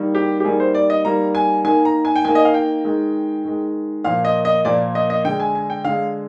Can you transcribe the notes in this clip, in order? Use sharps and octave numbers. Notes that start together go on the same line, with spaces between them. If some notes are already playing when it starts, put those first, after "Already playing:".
Already playing: D#3 G3 A#3
G4
G4
D#3 G3 A#3 G#4
C5
D5
D#5
D#3 G3 A#3 A#5
G#5
D#3 A#3 G#5
A#5
G#5
G5
D#3 A#3 G#5
D#5
F5
G5
D#3 G#3
D#3 G#3
A#2 F3 A#3 F5
D#5
D#5
A#2 F3 A#3 D5
D#5
D#5
D3 G#3 G5
G#5
G#5
G5
D3 G#3 F5